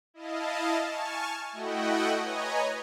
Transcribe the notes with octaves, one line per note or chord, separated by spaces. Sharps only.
E4 D#5 F5 A5
G#5 A5 C#6 F6
A3 E4 F#4 D#5 F#5 G5
B4 C#5 D#5 G#5 A#5